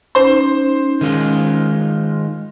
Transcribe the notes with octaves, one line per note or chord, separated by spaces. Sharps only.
C#4 D#4 C5 C6
D#3 G#3 F4